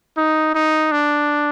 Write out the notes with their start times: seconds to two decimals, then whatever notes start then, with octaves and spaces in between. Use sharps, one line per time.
0.18 D#4
0.55 D#4
0.92 D4